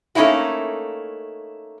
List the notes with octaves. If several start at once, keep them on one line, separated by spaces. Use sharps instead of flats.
A3 A#3 C#4 D#4 E4 F#4